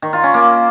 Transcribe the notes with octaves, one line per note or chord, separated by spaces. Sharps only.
D#3
F4
C#4
A#3